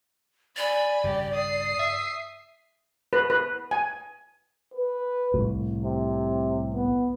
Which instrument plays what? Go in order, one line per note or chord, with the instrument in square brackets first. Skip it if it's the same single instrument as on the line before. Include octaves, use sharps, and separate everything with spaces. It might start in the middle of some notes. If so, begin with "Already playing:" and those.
[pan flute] D5 [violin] G#5 B5
[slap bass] G2 C#3 [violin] G4
[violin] D#6 C7
[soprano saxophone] E5
[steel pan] B4
B4
G#5
[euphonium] B4
[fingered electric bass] C2 A2
[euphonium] C3
B3